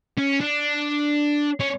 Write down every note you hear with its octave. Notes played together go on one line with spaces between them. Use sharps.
C#4
D4
C#4